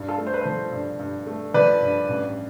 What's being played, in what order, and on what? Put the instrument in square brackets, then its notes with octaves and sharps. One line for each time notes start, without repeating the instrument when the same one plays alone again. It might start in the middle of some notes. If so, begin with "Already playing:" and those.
Already playing: [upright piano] G2
[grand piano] F4 A4
[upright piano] A3
[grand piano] C5
B4
[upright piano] F3 [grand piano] A4 C5
[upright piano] G2
G2
A3
[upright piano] F3 [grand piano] B4 D5
[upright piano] G2
A1